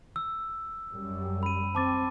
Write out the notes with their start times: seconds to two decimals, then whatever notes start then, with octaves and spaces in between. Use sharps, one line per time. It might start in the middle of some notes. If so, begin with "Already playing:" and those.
0.16 E6
0.92 F#2 G3
1.43 B5 D#7
1.75 C4 A5 D6 A6